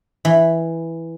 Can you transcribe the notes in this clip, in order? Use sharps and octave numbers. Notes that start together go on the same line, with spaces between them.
E3